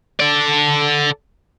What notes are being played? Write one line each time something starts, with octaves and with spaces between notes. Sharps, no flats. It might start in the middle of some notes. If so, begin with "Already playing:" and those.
A4 D5